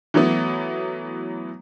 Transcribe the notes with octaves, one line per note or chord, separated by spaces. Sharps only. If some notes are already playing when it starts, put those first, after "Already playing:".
E3 F#3 A3 B3